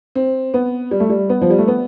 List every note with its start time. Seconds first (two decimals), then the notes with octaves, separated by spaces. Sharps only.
0.15 C4
0.54 B3
0.91 G3
1.00 A3
1.09 G3
1.29 B3
1.41 F3
1.50 G3
1.58 A3
1.68 B3